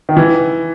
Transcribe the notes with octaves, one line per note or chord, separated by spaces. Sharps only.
D#3
E3